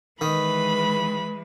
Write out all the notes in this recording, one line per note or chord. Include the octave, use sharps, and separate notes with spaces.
D#3 E3 G#3 B4 B5